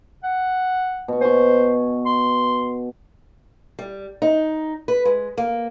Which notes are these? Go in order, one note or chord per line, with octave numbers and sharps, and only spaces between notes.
F#5
B2 C#6
C5 G#5 C#6
C6
G3
D#4
B4
G#3
A#3